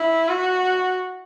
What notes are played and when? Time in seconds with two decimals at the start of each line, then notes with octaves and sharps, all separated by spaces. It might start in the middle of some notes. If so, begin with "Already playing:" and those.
Already playing: E4
0.29 F#4